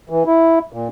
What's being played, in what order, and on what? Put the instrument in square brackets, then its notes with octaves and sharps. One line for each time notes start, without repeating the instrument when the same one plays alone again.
[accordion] E3
E4
A#2